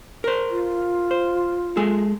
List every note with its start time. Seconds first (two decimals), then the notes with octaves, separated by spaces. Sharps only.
0.24 A#4 C5
0.50 F4
1.11 C5
1.77 G#3 G#4 A4